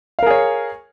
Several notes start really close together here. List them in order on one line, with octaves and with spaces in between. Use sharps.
F5 A#4 G#4 C#5